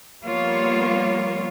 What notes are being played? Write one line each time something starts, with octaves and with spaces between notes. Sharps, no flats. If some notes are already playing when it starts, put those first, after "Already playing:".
F3 G3 A#3 B3 F4 C#5